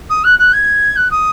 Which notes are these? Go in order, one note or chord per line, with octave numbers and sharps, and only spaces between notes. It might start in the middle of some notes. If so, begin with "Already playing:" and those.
D#6
F#6
F#6
G#6
F#6
D#6